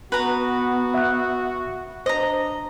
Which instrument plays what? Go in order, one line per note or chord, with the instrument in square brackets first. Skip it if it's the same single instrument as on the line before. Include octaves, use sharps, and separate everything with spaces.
[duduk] B3 [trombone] F#4 [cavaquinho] B4 A#5
[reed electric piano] E5 F#6
[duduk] D4 [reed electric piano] C5 [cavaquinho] D#5 A#5